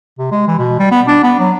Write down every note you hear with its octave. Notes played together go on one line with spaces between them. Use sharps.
C3
G#3
E3
B2
G3
B3
D4
B3
F#3